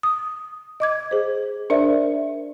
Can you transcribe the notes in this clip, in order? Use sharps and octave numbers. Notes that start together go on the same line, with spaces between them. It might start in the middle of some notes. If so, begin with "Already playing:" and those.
D#6
D#5 D6 G#6
G#4 C5
D4 A#4 C5 D5 E5